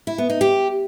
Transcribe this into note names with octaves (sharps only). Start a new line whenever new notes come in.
E4
B3
D#4
G4